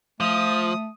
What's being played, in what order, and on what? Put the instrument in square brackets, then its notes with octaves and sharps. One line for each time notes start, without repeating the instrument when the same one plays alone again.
[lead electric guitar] F3 [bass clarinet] A3 [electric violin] D#6